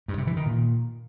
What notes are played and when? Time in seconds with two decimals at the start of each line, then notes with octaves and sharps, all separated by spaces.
0.08 G2
0.18 C3
0.27 E3
0.37 D#3
0.46 A#2